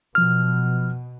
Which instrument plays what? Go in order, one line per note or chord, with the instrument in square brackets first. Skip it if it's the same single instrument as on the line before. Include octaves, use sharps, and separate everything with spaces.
[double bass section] B2 [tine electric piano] F3 F6